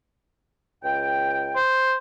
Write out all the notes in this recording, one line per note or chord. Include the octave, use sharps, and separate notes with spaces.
C#2 G5
C5